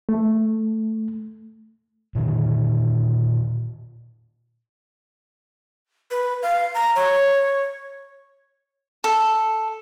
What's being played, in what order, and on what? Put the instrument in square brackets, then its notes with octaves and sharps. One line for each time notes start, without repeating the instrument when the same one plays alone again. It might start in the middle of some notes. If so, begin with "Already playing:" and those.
[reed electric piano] A3
[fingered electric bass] A#2 D3 D#3
[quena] B4
F5
A#5
C#5
[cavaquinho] A4